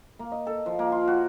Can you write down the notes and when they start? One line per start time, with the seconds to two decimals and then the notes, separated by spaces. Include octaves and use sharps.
0.19 A#3
0.32 D#5
0.47 A4
0.66 F3
0.79 A#3
0.92 F4
1.08 F#4